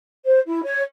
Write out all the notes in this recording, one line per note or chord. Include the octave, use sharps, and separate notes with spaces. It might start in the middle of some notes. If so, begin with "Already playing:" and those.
C5
E4
C#5